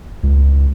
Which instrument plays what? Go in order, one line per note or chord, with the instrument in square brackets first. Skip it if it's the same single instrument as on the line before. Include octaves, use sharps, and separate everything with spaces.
[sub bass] C#2